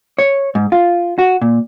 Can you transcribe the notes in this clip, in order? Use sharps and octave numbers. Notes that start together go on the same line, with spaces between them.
C#5
G#2
F4
F#4
A#2